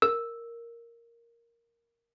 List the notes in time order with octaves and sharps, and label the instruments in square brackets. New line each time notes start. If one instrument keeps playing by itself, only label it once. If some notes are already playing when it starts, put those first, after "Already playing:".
[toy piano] A#4 [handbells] E6